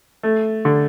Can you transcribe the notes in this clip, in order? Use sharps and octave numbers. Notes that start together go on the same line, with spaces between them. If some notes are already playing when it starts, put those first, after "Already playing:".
A3
D3